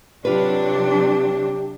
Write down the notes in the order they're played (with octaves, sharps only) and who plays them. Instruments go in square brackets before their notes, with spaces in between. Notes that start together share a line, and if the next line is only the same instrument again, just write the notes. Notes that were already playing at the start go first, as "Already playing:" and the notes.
[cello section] C3 F#3 D4 [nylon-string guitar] F4 B4 [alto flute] G4